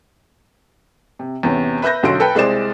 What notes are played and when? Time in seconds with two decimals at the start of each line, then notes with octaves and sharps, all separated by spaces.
1.19 C3
1.43 E2 C3 C#4
1.82 B4 E5 F#6 G6 A#6
2.03 B1 D3 F#3 C#4 C6 D7
2.20 A4 B4 G5
2.35 C2 G#3 C5 D5 E7